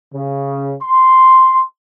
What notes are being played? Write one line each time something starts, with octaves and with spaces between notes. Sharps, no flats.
C#3
C6